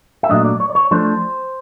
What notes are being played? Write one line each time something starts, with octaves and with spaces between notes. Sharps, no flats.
E5
A#2 F#3 A3 D4 D#5
D5
C#5
D5
C#5
F3 A3 D4 C5